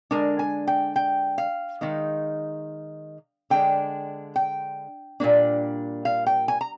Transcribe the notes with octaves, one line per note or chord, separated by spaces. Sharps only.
D3 G#3 D4 A#4
G#5
G5
G5
F5
D#3 G#3 D#4
D3 G#3 D4 G5
G5
A#2 G3 A#3 D4
F5
G5
G#5
A#5